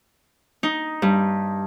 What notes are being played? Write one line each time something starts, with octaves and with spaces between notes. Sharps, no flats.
D#4
G2